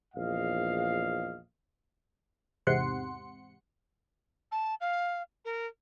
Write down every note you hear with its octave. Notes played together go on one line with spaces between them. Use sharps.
A#1 E2 D#5 F5
E2 G#2 C3 F#5 C6 C#7
A5
F5
A#4